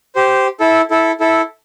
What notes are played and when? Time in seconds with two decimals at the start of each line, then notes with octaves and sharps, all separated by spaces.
0.15 G4 C5
0.60 E4 A4
0.91 E4 A4
1.20 E4 A4